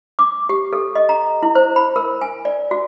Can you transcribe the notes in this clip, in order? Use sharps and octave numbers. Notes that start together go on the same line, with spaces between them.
D6
G4
A4
D#5
A#5
E4
C5
B5
A#4
G#5
D5
F#4